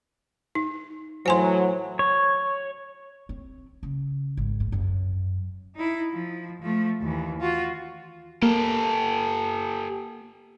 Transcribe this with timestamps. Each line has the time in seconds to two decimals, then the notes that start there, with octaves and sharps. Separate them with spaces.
0.55 D#4
1.26 A2 E3 F#3 C5 G#5 C6
1.99 C#5
3.29 C4
3.83 C#3
4.37 G#1
4.60 G#2
4.72 F#2
5.76 D#4 E4
6.12 F3
6.62 F3 A3
7.01 D#2 E3
7.41 F4 F#4
8.42 A#3 G4 A4